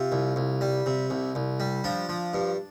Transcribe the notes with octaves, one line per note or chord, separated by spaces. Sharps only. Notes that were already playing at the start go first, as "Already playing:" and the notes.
Already playing: C3 F4
C2
C2
G3
C3
C2
C2
G3
F3 D4
F3
G2